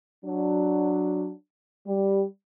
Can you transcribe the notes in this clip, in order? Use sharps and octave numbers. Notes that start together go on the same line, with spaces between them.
F#3 D4
G3